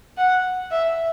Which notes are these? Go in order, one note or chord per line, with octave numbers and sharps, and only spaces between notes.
F#5
E5